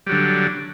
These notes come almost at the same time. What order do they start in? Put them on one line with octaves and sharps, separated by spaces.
G3 F#3 D3